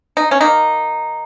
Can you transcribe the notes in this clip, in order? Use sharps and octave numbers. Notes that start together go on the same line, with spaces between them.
D#4
C#4
D#3 A#3 D#4